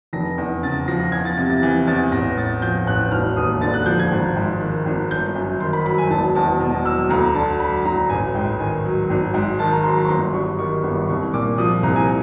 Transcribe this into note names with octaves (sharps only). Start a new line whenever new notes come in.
F1 A#6
E2
C#3 A6
F3 A#6
E2 G#6
A6
C3 A6
A6
E3 A6
E2 A6
A1 A#6
A2 A6
F3 G6
A1 F#6
E1 F6
D#2 D#6
D3 A6
F#6
F3 G6
G#6
G#1
G#2
D#3
G#1
G1 G6
F#2
D#3 C6
B5
F#3 B5
G#5
E1 A5
E2 A5
B2
F#3 E6
D2 A#5
D3 A5
F#3 B5
D2 A#5
A1 G#5
G#2 G5
D#3 G#5
F#3
G#1
G#2
D#3 A5
A#5
F#3 C6
A#5
C#6
G1 C6
G2 C#6
D#3 C#6
G1
C2 C#6
A#2 D6
F3 D#6
C2 A#5
G#5